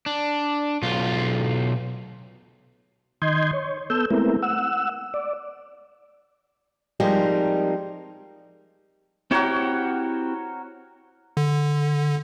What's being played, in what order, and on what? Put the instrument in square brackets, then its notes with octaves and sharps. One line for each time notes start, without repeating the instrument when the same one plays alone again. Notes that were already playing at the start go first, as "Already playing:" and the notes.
[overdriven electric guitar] D4
B1 F4
[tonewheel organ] D#3 D#5 C6 G6 G#6
C#5
B3 A4 E6 G6
G#3 A3 B3 C4 E4 A#4
F#5 E6
D5
[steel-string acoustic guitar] F3 G3 G#3 C4 D#4 A#4
[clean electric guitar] C4 E4 G4 [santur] F#4 A#4 C#5
[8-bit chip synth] D3